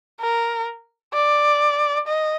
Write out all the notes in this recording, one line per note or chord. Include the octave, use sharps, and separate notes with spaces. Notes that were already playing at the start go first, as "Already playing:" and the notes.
A#4
D5
D#5